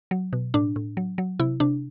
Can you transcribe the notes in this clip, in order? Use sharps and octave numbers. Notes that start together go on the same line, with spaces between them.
F#3
B2
A2 D4
A2
F#3
F#3
C3 E4
C3 D4